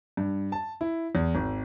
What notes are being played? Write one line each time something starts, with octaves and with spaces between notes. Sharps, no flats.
G2
A5
E4
E2
G#1